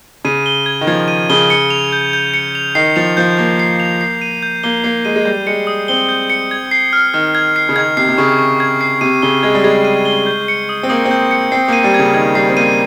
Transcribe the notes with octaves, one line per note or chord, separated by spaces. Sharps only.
C#3 D#7
G7
G#6
D#3
F3 G#6
D#7
C#3 G7
C#7
F7
G6
G6
C#7
F7
D#3 C7
F3 F7
F3 G6
A#3 G6
C7
F7
C7
D#7
G6
A#3 G7
A#3 C7
G#3 D#7
G#3
G3 G6
G#3 C#7
D#6
C4 G7
G6
C#7
G#6
C7
F6
D#3 F6
G#6
C7
C#3
D#3 G#6
C3 C7
C3
C#3 C#6
C#6
G#6
C7
C3 D#7
C#3 G7
G#3 G#6
G3
G#3 G#6
D#7
G7
G6
C#7
D#6
C4
A#3 D#6
C4
G6
C#7
C4 C7
A#3 D#7
G3
C#3 G#6
D#3 G#6
G3 C7
C4
A#3 D#7